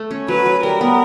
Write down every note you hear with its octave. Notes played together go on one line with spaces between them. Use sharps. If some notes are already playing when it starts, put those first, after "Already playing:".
Already playing: A3
C#4
F#3 B4
F#3
G3 A#4
B3